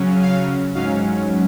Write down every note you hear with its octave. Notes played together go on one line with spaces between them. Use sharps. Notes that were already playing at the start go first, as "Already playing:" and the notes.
Already playing: C#3 F#3 C#4
F5
G#2 F#3 C#4 F5